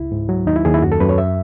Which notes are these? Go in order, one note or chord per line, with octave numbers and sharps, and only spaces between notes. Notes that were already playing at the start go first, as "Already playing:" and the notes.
Already playing: C#2 E4
G#2
F#3
D#2 D#4
E4
D#2 G#4
E4
F#2 F#4
A4
F#2 B4
C#5
E5